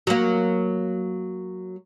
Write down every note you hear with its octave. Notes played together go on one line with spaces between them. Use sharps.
F#3 A#3